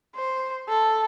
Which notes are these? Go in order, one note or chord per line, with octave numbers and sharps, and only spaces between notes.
C5
A4